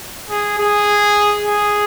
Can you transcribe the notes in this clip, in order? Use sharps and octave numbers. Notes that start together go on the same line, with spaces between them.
G#4
G#4
G#4